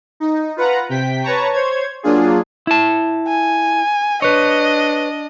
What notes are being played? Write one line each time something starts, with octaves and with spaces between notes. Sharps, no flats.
D#4
F4 B4 F#5 A#5
C3 G5 B6
B4 C#5 A5 A#5 C#6
C5 C#5 G#6
F#3 A#3 D4 F4 G#4
E4 A5
G#5
D4 B4 C#5 D#5